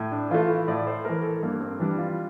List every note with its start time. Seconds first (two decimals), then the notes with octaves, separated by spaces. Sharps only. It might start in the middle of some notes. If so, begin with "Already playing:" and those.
Already playing: A2
0.12 D4
0.30 E3 A3 F4
0.49 E4
0.68 A2 D5
0.87 C5
1.05 E3 A3 A#4
1.23 A4
1.42 G2 A#3
1.60 C4
1.79 E3 G3 D4
1.98 F4